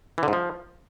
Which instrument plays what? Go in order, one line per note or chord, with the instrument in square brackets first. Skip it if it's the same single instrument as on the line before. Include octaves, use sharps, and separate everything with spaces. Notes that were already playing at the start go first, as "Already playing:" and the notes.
[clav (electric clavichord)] E3
D3
G#2
F3